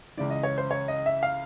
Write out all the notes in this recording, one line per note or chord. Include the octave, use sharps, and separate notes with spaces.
C#2 C#3 E3 D5
D#5
C#5
C5
C#5
D#5
E5
F5